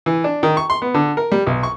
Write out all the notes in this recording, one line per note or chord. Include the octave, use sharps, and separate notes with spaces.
E3
D4
D#3
C#6
C6
B3
D3
A#4
G3
B1
C#6